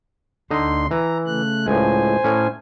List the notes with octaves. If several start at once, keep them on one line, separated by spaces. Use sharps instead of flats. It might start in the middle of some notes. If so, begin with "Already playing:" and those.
D2 D3 D#4 C6
E3 A#5
C#3 A3 F#6
C#2 A2 C5 G#5
A2 C#4